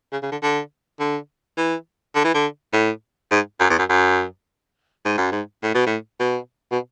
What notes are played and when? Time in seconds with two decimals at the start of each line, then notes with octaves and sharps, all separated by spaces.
0.12 C#3
0.23 C#3
0.31 D3
0.42 D3
0.99 D3
1.57 E3
2.15 D3
2.24 E3
2.34 D3
2.73 A2
3.31 G#2
3.60 F#2
3.70 E2
3.78 F#2
3.89 F#2
5.05 G#2
5.18 F#2
5.32 G#2
5.63 A2
5.74 B2
5.86 A2
6.20 B2
6.71 B2